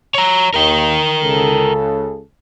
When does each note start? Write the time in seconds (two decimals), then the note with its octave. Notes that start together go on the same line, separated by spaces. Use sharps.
0.14 C#5 A#5
0.54 D#2 A#4 G5
1.22 C#2 C#3 A4